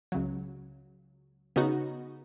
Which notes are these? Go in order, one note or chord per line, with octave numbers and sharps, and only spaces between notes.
C#2 C#3 F#3
C#3 B3 D#4 F#4